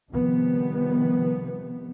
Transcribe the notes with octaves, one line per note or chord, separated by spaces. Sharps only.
C3 D#3 F3 G3 B3